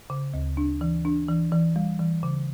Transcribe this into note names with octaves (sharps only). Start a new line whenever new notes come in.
C#3
D2
D4
E3
D4
E3
E3
G3
E3
C#3